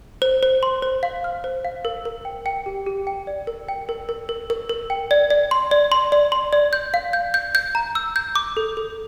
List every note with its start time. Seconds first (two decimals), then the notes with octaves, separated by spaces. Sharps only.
0.22 C5
0.43 C5
0.63 C6
0.82 C5
1.03 F5
1.24 F6
1.44 C5
1.65 F5
1.85 A#4
2.05 A#4
2.25 G5
2.46 G5
2.66 G4
2.86 G4
3.07 G5
3.27 D5
3.47 A#4
3.69 G5
3.89 A#4
4.09 A#4
4.29 A#4
4.50 A#4
4.69 A#4
4.90 G5
5.11 D5
5.30 D5
5.51 C6
5.71 D5
5.92 C6
6.12 D5
6.32 C6
6.53 D5
6.73 G6
6.94 F5
7.13 G6
7.34 G6
7.55 G6
7.75 A#5
7.95 E6
8.16 G6
8.36 D6
8.57 A4
8.77 A4